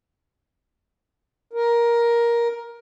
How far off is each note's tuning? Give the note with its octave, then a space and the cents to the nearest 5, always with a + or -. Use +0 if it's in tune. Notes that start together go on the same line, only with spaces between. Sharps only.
A#4 +10